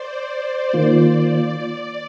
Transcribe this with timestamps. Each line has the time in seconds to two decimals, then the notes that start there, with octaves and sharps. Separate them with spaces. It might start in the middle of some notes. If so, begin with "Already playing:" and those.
Already playing: C5 D5
0.30 C5
0.73 D#3 A#3 F4 D5